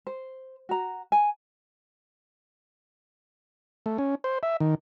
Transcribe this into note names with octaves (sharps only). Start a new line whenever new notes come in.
C5
F#4 A#5
G#5
A3
C#4
C5
E5
D#3